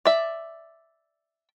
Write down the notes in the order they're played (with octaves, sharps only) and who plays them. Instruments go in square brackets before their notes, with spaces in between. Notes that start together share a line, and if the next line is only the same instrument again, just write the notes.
[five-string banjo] D5 E5